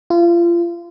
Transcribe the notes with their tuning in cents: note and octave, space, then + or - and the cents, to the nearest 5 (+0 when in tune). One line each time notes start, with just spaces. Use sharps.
F4 -30